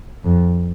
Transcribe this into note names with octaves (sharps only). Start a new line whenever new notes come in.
F2